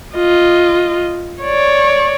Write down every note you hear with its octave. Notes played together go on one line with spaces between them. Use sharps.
F4 D#5
C#5 D5